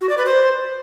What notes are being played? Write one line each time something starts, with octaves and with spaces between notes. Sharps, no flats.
F#4
D5
B4
C5